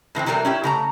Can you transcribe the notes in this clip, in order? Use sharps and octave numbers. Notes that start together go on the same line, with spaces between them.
A2 E3 A#3 C4
C3 E3 G3 A3 A#4
C#4 E4 G4
C#3 A3 A#5